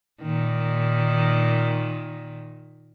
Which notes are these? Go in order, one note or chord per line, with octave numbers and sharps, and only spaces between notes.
A#2 D#3